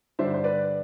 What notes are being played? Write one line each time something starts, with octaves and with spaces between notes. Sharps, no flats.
G2 D3 G3 D4 C5 E5
C5
B4 D5